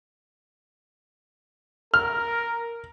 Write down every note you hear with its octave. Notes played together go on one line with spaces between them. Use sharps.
A#4 F6